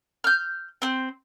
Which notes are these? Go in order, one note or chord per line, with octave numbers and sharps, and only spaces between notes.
F6 G6
C4 C5